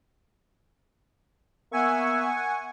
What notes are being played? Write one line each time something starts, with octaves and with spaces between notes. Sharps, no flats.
A#3 B3 E5 F#5 G#5 C#6